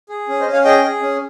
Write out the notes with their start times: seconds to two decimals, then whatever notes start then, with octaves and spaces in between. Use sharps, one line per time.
0.09 G#4
0.28 C#4
0.40 C5 D#5
0.46 C#4
0.53 C#5 F5
0.65 G#4 D#5 G5
0.84 G#4
1.02 C#4